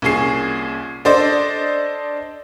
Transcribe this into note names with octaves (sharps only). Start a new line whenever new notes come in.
C2 A#2 C#4 G#4 C7
D4 A4 C5 D5 D#5